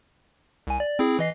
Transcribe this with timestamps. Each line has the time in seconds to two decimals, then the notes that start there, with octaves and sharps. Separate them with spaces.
0.67 C2 G#5
0.80 D5
0.99 C4 E4 G#4
1.19 E3 D#5 C7